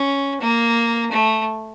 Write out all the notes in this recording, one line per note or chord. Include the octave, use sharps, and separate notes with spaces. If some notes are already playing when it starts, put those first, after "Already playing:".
Already playing: C#4
A#3
A3